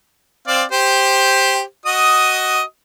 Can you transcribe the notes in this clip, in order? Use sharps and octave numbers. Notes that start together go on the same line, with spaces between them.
C4 D5 F5
G4 C5
F#4 D#5 D#6